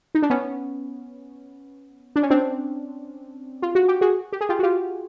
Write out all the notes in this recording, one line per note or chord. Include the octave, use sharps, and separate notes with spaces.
D#4
D4
B3 C#4
D4
C#4
C4 D4
F4
F#4
G4
F#4 G#4
G4
G#4
F4 G4
F#4
F4 G4